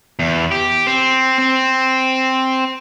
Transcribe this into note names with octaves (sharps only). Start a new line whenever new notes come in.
E2
G4
C4
C4